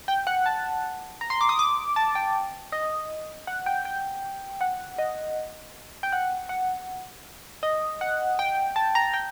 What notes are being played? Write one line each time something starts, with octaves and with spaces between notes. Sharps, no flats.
G5
F#5
A5
A#5
C6
D6
D#6
D6
A5
G5
D#5
F#5
G5
G5
F#5
D#5
G5
F#5
F#5
D#5
F#5
G5
A5
A#5
G5